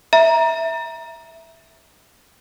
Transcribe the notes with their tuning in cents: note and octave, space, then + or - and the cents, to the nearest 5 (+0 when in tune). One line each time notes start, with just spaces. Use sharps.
E5 -5 A#5 +15